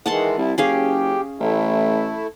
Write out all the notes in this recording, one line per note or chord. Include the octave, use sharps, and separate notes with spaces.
D#3 E3 G#3 F#5 A5 C6
C2 E4
F#1 C#4 G4 G#4 F5
A1 A3 E4